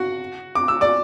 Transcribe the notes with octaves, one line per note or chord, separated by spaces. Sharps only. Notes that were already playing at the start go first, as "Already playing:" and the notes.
Already playing: F#4 F#5
D6
E6
D5 D6